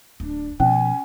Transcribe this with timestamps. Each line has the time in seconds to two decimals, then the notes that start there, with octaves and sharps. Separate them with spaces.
0.20 D1 D4
0.60 B2 F3 C#4 G#5